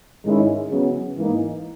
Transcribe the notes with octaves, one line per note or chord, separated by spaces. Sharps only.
G#2 D#3 G#3 C#4 E4
C#3 F#3 B3
G#2 E3 A#3 D#4